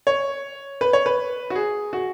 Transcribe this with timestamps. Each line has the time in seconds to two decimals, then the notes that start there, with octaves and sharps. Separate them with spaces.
0.07 C#5
0.81 B4
0.93 C#5
1.06 B4
1.50 F#4
1.55 G#4
1.93 F#4